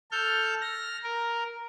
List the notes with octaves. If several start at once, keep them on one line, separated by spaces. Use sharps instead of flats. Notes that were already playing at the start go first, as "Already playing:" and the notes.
A4 F6 G6
F6 A#6
A#4